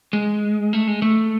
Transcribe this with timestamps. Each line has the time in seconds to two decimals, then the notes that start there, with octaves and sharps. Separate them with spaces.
0.13 G#3
0.73 A3
0.88 G#3
1.02 A3